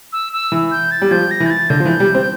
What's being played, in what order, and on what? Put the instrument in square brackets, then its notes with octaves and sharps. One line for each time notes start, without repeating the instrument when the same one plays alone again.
[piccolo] E6
E6
[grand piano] E3
[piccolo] G6
A6
[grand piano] G3
[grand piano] F3 [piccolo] G6
[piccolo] A#6
[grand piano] E3
[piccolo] G6
A6
[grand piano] D3 [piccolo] G6
[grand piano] F3
E3
G3
C4